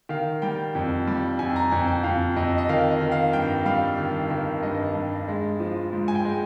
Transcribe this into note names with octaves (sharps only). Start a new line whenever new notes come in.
D#3 F5
G3 G5
F2
G3
F2 G#5
A#5
F2 G#5
G5
F2 F5
F2 D#5
D#5
D#3 F5
D#5
D#3
F5
G2 G5
G3 F5
D#3
D#3
G2 D#5
G2
G#3
F3
G#2
G#5
G5
G#3